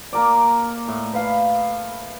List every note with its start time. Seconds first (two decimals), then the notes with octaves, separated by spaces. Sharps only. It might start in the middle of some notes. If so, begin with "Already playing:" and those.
0.13 A#3 A#4 D5
0.88 A2
1.13 B4 F5 B5